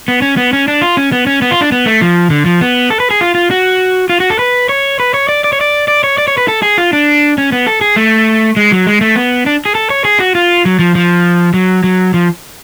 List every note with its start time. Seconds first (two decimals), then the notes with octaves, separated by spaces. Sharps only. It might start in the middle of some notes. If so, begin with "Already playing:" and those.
0.08 B3
0.22 C#4
0.37 B3
0.53 C#4
0.68 D4
0.81 F4
0.97 C#4
1.12 B3
1.27 C#4
1.42 B3
1.51 F4
1.61 D4
1.72 B3
1.86 A3
2.02 F3
2.30 D3
2.46 F3
2.61 B3
2.90 A4
3.00 B4
3.11 G#4
3.21 F4
3.35 F4
3.51 F#4
4.09 F4
4.20 F#4
4.30 A4
4.39 B4
4.69 C#5
5.00 B4
5.14 C#5
5.29 D5
5.44 D5
5.53 C#5
5.61 D5
5.88 D5
6.04 C#5
6.18 D5
6.28 C#5
6.38 B4
6.48 A4
6.62 G#4
6.78 F4
6.93 D4
7.38 C#4
7.52 B3
7.67 A4
7.81 G#4
7.96 A3
8.56 G#3
8.72 F#3
8.87 G#3
9.01 A3
9.16 B3
9.46 D4
9.65 G#4
9.75 A4
9.90 C#5
10.05 G#4
10.20 F#4
10.35 F4
10.65 F#3
10.79 F3
10.95 F3
11.54 F#3
11.84 F#3
12.14 F3